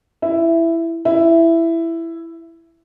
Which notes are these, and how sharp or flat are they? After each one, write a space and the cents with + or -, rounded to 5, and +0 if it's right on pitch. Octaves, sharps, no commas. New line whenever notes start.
E4 +10
E4 +10